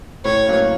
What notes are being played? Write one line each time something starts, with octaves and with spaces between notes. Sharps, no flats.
A2 C#5
F#3 A#3 C#4